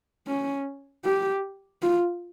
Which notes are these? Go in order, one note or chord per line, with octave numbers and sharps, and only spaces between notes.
C#4
G4
F4